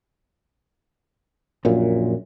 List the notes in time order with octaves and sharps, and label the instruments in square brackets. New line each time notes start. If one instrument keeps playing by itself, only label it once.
[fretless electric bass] A#1 F#2 A#2